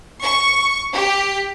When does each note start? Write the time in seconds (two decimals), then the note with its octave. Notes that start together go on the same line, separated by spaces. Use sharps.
0.22 C#6
0.93 G4